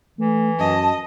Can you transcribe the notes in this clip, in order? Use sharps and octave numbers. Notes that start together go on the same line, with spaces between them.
E3 A3
F#2 D#5 A5